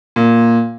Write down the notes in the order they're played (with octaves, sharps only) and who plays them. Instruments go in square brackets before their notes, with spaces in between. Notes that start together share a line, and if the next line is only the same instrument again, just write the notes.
[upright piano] A#2